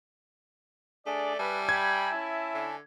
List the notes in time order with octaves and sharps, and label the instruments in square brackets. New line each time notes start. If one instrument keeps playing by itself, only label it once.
[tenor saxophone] A3 [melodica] D4 G#4 [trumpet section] D5
[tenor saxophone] G3 [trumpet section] B4 [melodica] E5 G#5 A5
[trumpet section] G5 A#5 B5 [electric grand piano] G#6
[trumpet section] C#4 E4
[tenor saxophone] D3